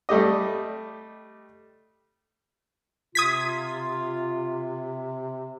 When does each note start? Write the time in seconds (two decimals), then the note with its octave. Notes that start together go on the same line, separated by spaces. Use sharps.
0.09 G3 A3 G4 D#5
3.15 C3 F4 D#6 G#6 B6